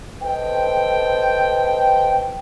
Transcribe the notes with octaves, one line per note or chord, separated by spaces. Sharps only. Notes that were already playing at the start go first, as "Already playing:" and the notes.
A4 B4 C5 D#5 G5